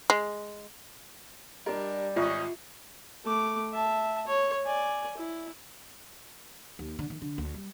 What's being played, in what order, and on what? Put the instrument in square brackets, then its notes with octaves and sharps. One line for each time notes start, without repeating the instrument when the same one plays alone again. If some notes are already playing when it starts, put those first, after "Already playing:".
[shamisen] G#3
[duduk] G3 [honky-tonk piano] D4 A#4 [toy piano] G4 D#5
[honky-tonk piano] G#1 [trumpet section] C#4 F#4 D#5 [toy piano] F4 E5
[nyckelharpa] A3 D6
E5 A5
C#5
D5 G#5
E4
[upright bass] D#2
D3
D#3
D3
D2
G3